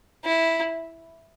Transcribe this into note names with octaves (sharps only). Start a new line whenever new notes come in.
E4